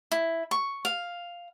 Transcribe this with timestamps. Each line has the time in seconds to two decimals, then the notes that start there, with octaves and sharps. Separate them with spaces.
0.12 E4
0.51 C#6
0.85 F5